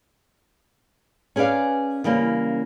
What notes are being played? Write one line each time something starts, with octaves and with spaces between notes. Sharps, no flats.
C#4 G#4 B4 D5 F5
C#3 E3 G3 A#3 C#4